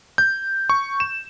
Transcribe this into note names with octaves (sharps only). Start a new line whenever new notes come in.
G6
C#6
E7